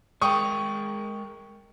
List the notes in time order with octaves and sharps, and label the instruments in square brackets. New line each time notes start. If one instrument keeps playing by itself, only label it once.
[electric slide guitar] G#3 A#4 [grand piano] G5 C#6 D#6